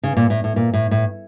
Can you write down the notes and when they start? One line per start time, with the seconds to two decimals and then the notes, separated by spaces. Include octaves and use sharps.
0.03 C#3
0.17 A#2
0.30 A2
0.44 A2
0.56 A#2
0.74 A2
0.91 A2